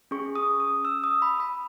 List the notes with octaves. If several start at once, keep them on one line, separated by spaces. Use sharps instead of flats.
C#4 G#4 C#6
D#6
D#6
E6
D#6
B5
B5